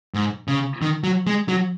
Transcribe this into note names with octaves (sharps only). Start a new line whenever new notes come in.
G#2
C#3
D#3
F#3
G#3
F#3